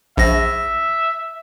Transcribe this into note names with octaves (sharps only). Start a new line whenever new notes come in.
A#1 E5 A#6